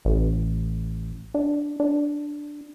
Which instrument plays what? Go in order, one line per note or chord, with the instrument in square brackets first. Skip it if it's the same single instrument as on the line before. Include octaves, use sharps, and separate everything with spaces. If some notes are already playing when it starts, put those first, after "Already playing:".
[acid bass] A1
D4
D4